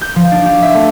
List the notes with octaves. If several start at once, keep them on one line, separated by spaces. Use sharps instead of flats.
G6
F3
D4
G4
E5
A3